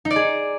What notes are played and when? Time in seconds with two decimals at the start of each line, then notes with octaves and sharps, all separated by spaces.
0.05 D#4
0.11 D5
0.16 G#4